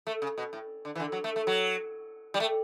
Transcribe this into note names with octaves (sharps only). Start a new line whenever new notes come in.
A3
C#3
B2
A2
D3
E3
D3
F#3
A3
A3
F#3
G3
A3